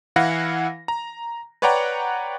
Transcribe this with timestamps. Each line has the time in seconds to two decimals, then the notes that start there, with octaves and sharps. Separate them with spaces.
0.16 E3 E4 B4 F5 F#5 A#6
0.88 A#5
1.62 B4 C#5 D5 F#5 G5 A#5